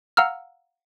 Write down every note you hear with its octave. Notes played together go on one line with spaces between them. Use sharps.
F5 F#5 A#5 E6 F6